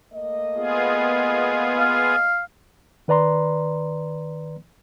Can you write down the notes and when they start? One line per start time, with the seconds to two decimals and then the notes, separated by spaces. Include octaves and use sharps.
0.12 A3 A#3 D#5
0.55 B3 F4 G#4
1.78 F5
3.08 D#3 B4 D5 A#5 C6